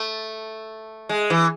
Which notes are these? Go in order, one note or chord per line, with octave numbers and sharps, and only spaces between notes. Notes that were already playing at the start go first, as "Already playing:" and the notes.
Already playing: A3
G#3
E3